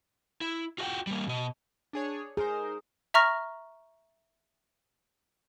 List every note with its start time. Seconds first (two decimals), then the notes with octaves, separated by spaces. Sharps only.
0.41 E4
0.78 F4 F#4 E5 F#5 G5
1.07 G3 A#3
1.27 B2 D#5
1.93 D4 G#4 C#5
2.37 D#4 G#4 A#4 C5
3.14 E5 A#5 C#6 F6 A#6